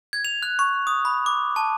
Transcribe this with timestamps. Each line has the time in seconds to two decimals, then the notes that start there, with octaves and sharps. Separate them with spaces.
0.13 G#6
0.25 F7
0.43 F#6
0.59 C#6
0.87 D#6
1.05 B5
1.26 D6
1.56 A5